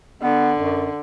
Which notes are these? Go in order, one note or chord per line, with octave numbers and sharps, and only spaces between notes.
D3 B3
F#2